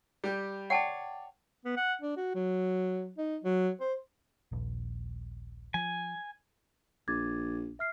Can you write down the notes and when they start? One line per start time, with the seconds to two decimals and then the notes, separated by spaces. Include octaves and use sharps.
0.24 G3 G4
0.70 C#5 D5 F#5 G5 A5
1.65 B3
1.77 F#5
2.02 D4
2.17 F#4
2.35 F#3
3.18 D#4
3.44 F#3
3.81 C5
4.52 D#1 A#1
5.74 F3 G#5
7.08 A#1 D6 G#6 A6
7.79 E5 F6 C7